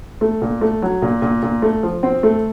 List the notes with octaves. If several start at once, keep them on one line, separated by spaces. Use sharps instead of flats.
A3
A#2
A3
F#3
A#2
A#2
A#2
A3
F3
C4
A3